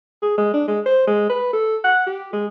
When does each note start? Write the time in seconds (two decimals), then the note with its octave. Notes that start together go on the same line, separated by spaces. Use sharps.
0.22 G#4
0.38 G#3
0.53 D4
0.68 G#3
0.86 C5
1.07 G#3
1.29 B4
1.53 A4
1.84 F#5
2.06 G4
2.33 G#3